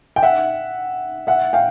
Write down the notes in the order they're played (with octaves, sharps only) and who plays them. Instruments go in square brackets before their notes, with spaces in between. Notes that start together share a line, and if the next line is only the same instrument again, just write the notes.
[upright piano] G5
E5 F#5
E5 F#5
F5 G5